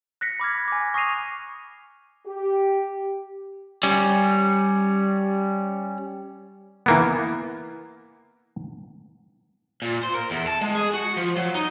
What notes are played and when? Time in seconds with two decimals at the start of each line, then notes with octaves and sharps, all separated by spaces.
0.21 F#6 A#6 B6 C#7
0.40 B5 D6 F6 G#6
0.68 G#5 D6
0.94 C#6 D#6 A#6 C7 D#7 F7
2.26 G4
3.83 G3 C#4
6.86 E3 A#3 B3
9.82 A#2
10.03 C5
10.15 A#4
10.30 E2
10.47 A5
10.61 G#3
10.75 G#4
10.94 F#4
11.17 F3
11.36 F#3
11.54 D#4